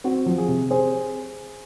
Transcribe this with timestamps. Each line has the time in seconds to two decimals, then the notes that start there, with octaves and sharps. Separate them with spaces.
0.04 C4 F#4
0.26 F3
0.38 G#4
0.48 C3
0.70 C4 G#4 C5